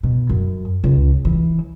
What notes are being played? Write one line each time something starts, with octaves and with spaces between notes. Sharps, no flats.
B2
F#2
C#2
E3